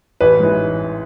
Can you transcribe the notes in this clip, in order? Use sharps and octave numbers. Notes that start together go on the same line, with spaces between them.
A1 B4
G#2 E3